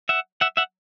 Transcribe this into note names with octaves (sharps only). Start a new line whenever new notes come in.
E5 F#5
E5 F#5
E5 F#5